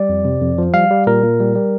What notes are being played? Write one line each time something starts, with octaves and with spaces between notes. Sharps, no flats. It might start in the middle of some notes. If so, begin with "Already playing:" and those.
Already playing: G3 D5
F2
C3
F2
F3
G3 F5
G3
A#2 A#4
A#2
G3
G3